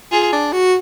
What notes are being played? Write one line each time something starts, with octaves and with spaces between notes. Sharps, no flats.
F4 G#4
D4
F#4